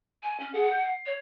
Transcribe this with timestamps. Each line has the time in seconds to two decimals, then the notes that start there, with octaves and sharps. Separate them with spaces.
0.23 G#5
0.40 C#4
0.54 G#4 F#5
0.71 G6
0.84 C7
1.06 C#5